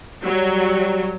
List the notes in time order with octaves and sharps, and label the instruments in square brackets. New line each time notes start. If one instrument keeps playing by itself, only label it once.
[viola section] F#3 [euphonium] G3